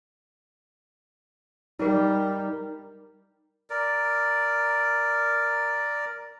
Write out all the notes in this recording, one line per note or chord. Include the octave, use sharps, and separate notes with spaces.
G3 D#4 A#4
A#4 D5